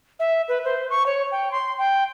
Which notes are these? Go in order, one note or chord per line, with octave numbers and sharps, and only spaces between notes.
E5
B4
C5
C#6
C#5
G5
C6
G5